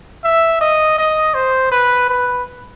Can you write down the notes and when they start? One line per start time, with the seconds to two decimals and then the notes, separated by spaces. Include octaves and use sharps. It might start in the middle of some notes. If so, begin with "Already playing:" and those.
0.24 E5
0.61 D#5
0.98 D#5
1.34 C5
1.72 B4
2.09 B4